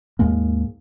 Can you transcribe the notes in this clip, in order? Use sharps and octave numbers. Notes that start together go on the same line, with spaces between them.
D#2 G#2 G#3 A#3